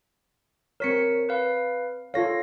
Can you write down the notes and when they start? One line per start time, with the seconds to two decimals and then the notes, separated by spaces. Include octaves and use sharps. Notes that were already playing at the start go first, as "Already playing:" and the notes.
0.80 C4 A#4 C#5 B6 C#7
1.29 B4 F5
2.14 F4 A4 C#5 F5 A#6